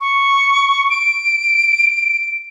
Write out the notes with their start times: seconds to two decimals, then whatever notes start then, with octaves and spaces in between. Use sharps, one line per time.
0.01 C#6
0.90 D7